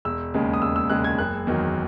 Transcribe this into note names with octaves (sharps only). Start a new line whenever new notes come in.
E1 E6
D#2 C#3 G#3
D#6
E1 E6
E6
D#2 C#3 G#3 F#6
G#6
F#1 F#6
E2 D#3 F#3